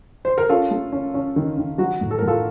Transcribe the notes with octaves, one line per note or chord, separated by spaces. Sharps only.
C5
A#4
C#4 F4 A4
A3
C#4
C#4
D#3
D#3
F#3 F#4
A2
A4
A#4
A2
F4 A4